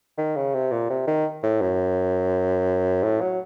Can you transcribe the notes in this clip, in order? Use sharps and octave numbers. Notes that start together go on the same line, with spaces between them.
D#3
C#3
C3
A#2
C3
D#3
A2
F#2
A2
F#3